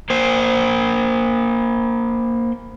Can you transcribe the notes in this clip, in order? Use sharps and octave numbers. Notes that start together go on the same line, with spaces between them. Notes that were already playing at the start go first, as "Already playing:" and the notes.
A#3 C5